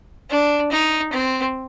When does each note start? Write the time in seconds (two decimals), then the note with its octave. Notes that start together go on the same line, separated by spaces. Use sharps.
0.30 D4
0.71 D#4
1.13 C4